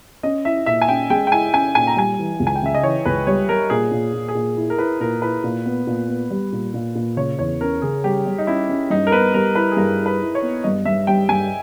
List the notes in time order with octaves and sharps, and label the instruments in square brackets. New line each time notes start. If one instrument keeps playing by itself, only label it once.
[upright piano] C#4 [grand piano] D#5
[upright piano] E4 [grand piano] E5
[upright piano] A#2 [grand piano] E5
[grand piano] G#5
[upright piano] C#4 [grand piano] G5
[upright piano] G#3 [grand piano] G5
[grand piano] G5
[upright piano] E4 [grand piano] G#5
[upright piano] C#4 [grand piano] G#5
[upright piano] A#2 [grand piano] G#5
[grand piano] A#5
[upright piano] G3 [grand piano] G#5
[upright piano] E3
C#2
[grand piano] G#5
G5
[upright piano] C#3 [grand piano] E5
[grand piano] D#5
[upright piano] E3 [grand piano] C#5
[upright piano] C#2 [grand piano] B4
[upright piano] G3 [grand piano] C#5
[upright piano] G3 [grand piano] A#4
[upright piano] A#2 [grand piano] G#4
[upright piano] A#2
A#2
[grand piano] G#4
[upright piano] A#2
E4
[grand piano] A#4
[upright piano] E4 [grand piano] B4
[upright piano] A#2 [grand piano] A#4
[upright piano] E4 [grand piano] B4
[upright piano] A#2
B3
A#2
B3
G3
A#2
A#2
A#2
[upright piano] C#3 [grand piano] C#5
[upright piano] E2 [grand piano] C#5
[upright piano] C#4 [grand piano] A#4
[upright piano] C#3 [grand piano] G#4
[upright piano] G3 [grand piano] G4
[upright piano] G3
[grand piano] D#4
[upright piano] C#4 [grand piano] E4
[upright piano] C#4
[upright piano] G2 [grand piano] D#4
[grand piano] A#4
[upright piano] B3 [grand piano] B4
[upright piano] G3 [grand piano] A#4
[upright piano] E4 [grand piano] B4
[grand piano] G#4
[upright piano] G2 [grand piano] A#4
[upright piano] E4
[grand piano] B4
[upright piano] E4
[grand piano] C#5
[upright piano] B3
[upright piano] G2 [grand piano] D#5
[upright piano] G2 [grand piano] E5
[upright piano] G3 [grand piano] G5
[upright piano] G2 [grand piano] G#5